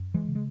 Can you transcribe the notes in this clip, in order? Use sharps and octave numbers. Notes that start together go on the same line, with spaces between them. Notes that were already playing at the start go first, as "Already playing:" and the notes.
Already playing: F#2
E3 G#3
C#3
G#3